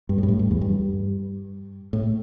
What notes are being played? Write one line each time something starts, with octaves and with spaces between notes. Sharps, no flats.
G2
A2
G2
A2
G2
E2
G2
A2